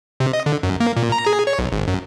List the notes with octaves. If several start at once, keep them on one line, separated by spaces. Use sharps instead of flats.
C3
D#5
D3
F#2
A#3
A#2
A#5
G#4
C#5
B1
G#1
F#2